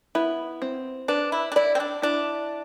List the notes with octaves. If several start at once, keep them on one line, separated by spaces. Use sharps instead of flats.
B3 E4
C4
D4 B4
E4
D4
E4 D5
C4
D4
D4 E4